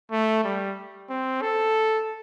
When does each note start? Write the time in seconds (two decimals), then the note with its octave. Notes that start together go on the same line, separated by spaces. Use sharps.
0.11 A3
0.44 G3
1.09 C4
1.42 A4